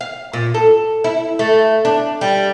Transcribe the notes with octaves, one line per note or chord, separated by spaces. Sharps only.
F5
A#2
A4
E4
A3
D4
G3